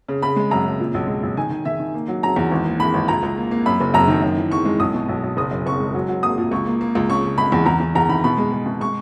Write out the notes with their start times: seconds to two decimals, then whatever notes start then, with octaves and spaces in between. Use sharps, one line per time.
0.08 C#3
0.23 C#3 B5
0.36 G#3
0.51 F#2 A#5
0.66 C#3
0.80 A#2
0.94 B1
1.08 G#3
1.23 B1
1.37 D#3 G#5
1.51 D#3
1.65 D#3 E5
1.80 D#3
1.94 A#3
2.08 F#3
2.23 F#3 A#5
2.36 E2
2.52 G#1
2.65 A#3
2.79 E3 B5
2.94 G#1
3.08 C#2 A#5
3.23 C#2
3.38 A#3
3.51 A#3
3.66 F#2 B5
3.80 F#1
3.94 F#2 A#5
4.08 D#3
4.22 F#2
4.37 E3
4.51 E3 C#6
4.65 G#3
4.80 B1 D#6
4.94 B2
5.09 B1
5.23 B1
5.37 F#1 D#6
5.51 F#2
5.66 F#1 C#6
5.80 G#3
5.94 F#3
6.09 F#3
6.23 A#3 D#6
6.38 A#2
6.51 C#2 C#6
6.66 A#3
6.81 A#3
6.95 C#2
7.10 C#3 C#6
7.24 C#3
7.38 G#3 B5
7.52 E2
7.66 E2 A#5
7.80 E2
7.95 E2 A#5
8.09 D#3 B5
8.24 B2 B5
8.38 G#3
8.52 G#3
8.66 B2
8.80 G#3 C#6